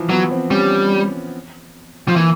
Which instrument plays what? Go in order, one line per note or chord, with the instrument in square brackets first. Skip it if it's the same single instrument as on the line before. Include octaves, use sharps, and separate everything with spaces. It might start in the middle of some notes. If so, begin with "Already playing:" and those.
Already playing: [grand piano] E3 F3
[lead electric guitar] F#3 [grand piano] B3
[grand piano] C4
[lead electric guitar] G3 [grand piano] C#4
[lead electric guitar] F3
[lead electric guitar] E3 [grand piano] A#3